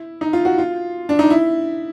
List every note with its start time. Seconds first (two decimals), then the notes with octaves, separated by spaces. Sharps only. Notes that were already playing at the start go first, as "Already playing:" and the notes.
Already playing: E4
0.21 D#4
0.33 F4
0.45 F#4
0.58 F4
1.09 D4
1.19 D#4
1.30 E4